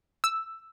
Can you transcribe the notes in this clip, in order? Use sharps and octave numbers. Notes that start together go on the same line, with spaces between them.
E6